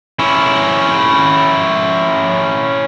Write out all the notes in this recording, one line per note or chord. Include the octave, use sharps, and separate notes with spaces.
C#4 E4